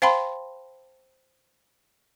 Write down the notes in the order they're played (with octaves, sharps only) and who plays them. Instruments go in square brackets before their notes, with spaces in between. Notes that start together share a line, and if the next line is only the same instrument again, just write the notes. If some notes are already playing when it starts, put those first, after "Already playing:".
[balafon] C5 F5 G5 A5 B5 C6